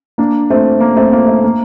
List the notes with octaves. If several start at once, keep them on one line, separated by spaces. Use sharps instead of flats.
A#3 D4
A3 C4
A#3
A3 C4
A#3
A3
A#3